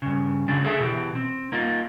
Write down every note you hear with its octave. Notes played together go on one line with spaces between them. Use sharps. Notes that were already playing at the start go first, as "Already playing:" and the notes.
G2 C#3
C#3 G#3 D4
G#4 A4 E5
B2 E3 G4
C4
A#3 D#4 F4